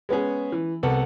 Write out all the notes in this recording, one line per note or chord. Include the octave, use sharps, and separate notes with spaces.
G#3 B3 C#4 G#4
E3
C2 B3 A4 F#5